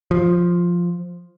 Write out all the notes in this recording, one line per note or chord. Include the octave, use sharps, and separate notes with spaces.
F3